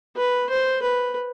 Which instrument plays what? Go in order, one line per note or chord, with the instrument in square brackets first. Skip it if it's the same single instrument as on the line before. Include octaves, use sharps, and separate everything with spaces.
[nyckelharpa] B4
C5
B4